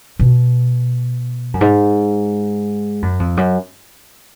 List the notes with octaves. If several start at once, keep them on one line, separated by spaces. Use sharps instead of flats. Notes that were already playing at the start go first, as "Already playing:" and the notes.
B2
F#2
G#2
F#2
F2
F#2